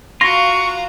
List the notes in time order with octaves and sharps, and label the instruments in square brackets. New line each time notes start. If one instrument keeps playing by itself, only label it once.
[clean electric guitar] F4 [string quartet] F#4 F5 A#5 [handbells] C6 A#6 [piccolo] C#6